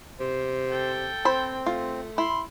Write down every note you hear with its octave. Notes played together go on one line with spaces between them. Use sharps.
C3 C5
A4 G5
C4 C5 B5
A3 F4
E4 B5 C6